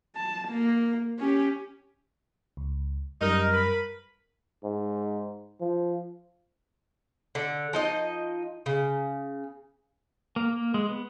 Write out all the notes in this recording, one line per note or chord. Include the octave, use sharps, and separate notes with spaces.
A5
A#3
C#4 G4
C#2
F#2 G3 D#4 A#4 F6
B4 B5
G#2
F3
D3
F3 D#4 D#5
C#3
A#3
A#3
G#3
B3